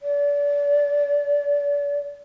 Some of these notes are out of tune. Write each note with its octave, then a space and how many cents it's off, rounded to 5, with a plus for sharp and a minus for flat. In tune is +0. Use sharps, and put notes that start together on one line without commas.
D5 -35